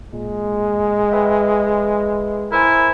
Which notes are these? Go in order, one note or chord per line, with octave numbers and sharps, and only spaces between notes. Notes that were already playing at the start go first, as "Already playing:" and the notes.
A#2 G#3
B4 E5 G5
E4 A#4 C5 G#5